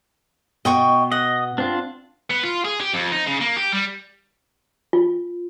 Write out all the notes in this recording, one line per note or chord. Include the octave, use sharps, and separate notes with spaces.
B2 D#5 G5 C#6
D#5 F#5
C4 D4 F4
B3
F4
G#4
G4
F2
D#4
C#3
A#3
G4
G3
F4